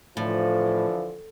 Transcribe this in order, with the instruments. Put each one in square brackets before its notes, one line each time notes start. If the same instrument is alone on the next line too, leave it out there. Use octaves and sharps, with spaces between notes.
[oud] A2 [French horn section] D3 E3 F3